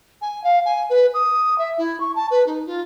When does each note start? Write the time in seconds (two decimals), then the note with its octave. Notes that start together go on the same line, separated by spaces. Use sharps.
0.21 G#5
0.44 F5
0.65 G#5
0.90 B4
1.14 D#6
1.58 E5
1.78 E4
2.00 C#6
2.15 A5
2.31 B4
2.46 D#4
2.66 F4